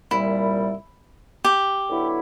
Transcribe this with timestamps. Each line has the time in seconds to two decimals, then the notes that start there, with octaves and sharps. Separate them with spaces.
0.11 C2 A#2 G3 E4
1.45 G4
1.89 D3 F#3 B3 E4